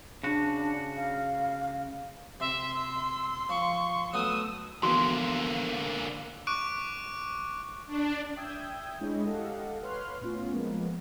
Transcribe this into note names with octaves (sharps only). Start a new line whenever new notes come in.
C#3 D4 F#4
F5
C3 E5 C6
E6
F3 C#6
F#3 A3 B3 D#6 E6
D3 E3 F3 A#3 B3 F#4
C#6 D6 F#6 D7
D4
E5 G5 D#6 E6 G6 G#6
G#3 D4 E4 G#4 C#5 D#5
G4 A4 D#5 F5 F#5
B4 C#5 C6 F6 F#6
A2 B3 C#4 F4
F3 G#3 A#3 B3